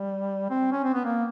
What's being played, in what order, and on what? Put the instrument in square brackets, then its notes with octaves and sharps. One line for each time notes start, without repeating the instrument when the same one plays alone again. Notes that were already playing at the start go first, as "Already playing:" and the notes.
Already playing: [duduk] G3
C4
C#4
C4
B3
A#3